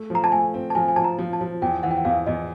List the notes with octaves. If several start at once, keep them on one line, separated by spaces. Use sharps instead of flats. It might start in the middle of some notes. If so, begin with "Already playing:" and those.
Already playing: A3
F3
A#5
A5
A3 G#5
C4
A5
F3 G#5
G#5
F3 A5
A#5
F3
A5
F3
E2 G5
E3 F#5
G5
F#5
E2 F5
E2 D#5